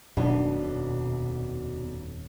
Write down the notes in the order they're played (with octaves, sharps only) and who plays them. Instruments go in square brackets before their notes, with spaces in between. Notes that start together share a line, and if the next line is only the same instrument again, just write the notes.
[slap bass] D#1 F2 [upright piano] B1 D4 [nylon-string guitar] B2